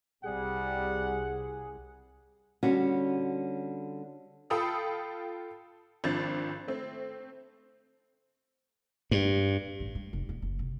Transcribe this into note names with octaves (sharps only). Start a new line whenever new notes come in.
C2 C3 G3 G#4 F#5
D3 G3 C#4 F#4
F4 A4 G5 B5 D#6 E6
G#1 F3 C4 D4 A6
A3 C4
G2
A1
G3
F1
D#1
F#1
C2